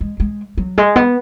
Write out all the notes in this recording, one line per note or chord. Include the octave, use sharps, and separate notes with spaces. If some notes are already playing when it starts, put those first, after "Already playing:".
G#3
G#3
F#3
G#3
B3